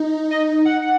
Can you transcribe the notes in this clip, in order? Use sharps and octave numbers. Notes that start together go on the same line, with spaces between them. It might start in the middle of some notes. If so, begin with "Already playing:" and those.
Already playing: D#4
D#5
F#5
F#5